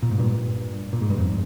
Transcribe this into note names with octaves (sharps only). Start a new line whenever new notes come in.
A#2
G#2
G2 A#2
A#2
G#2
G2
F2 G#2